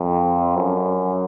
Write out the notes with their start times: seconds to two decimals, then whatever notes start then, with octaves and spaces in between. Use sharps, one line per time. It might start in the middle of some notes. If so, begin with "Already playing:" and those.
Already playing: F2
0.55 F#2